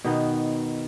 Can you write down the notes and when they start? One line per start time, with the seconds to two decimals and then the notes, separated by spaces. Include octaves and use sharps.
0.04 B2 D#3 B3